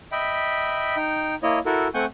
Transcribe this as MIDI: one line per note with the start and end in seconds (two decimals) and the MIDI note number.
0.12 0.96 75
0.12 0.96 76
0.12 0.96 79
0.12 0.96 83
0.96 1.35 63
0.96 1.35 79
1.43 1.59 58
1.43 1.59 64
1.43 1.59 73
1.43 1.59 75
1.66 1.88 64
1.66 1.88 66
1.66 1.88 69
1.66 1.88 70
1.94 2.05 57
1.94 2.05 60
1.94 2.05 78
1.94 2.05 80
1.94 2.05 85
1.94 2.05 91